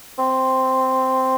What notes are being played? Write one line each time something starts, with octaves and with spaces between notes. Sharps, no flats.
C4